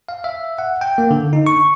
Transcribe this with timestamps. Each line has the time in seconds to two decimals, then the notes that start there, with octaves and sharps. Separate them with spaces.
0.09 F5
0.24 E5
0.59 F#5
0.81 G5
0.98 A#3
1.11 D3
1.33 D#4
1.46 C#6